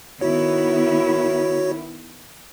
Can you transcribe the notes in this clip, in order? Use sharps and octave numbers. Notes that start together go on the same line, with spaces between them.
D#3 B3 E4 F#4 C#5